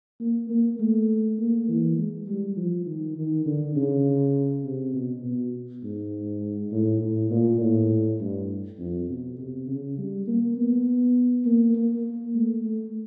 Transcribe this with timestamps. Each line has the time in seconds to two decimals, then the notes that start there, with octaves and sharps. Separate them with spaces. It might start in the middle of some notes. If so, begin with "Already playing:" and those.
0.20 A#3
0.49 A#3
0.79 A3
1.38 A#3
1.68 E3
1.98 G#3
2.27 G3
2.56 F3
2.86 D#3
3.16 D#3
3.46 D3
3.75 C#3
4.64 C3
4.94 B2
5.24 B2
5.83 G#2
6.72 A2
7.01 A2
7.31 A#2
7.60 A2
8.20 G2
8.79 F2
9.08 B2
9.38 C3
9.67 C#3
9.98 G3
10.27 A#3
10.57 B3
11.45 A#3
11.75 A#3
12.35 A3
12.64 A3